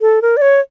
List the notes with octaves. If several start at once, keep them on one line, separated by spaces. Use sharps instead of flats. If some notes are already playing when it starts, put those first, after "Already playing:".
A4
A#4
D5
C#5